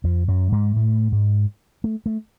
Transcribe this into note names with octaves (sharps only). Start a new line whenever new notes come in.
F2 F3
F#2 F#3
G#2 G#3
A2 A3
G#2 G#3
A3
A3